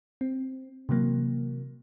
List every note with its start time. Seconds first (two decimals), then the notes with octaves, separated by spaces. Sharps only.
0.21 C4
0.89 C3 E3 F#3 A#3